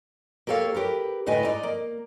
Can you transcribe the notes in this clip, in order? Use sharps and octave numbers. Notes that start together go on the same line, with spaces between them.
A#3 G4 A4 C#5 F5
G4 A#4 B4
D2 A2 G3 B4 D#5 G#5
G#2 D5 D#5 A#5
A#3